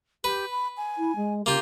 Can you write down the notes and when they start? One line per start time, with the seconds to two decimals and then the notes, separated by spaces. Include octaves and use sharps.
0.24 G4 B4
0.52 B5
0.77 G#5
0.97 E4
1.15 G#3
1.46 C#3 A#3 F4 G4